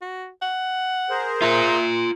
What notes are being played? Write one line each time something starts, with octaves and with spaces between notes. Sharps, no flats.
F#4
F#5
G#4 A#4 C5
F4 E5 A#5